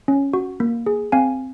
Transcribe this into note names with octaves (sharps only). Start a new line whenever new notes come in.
C#4
F#4
A#3
G#4
C4 F5 G#5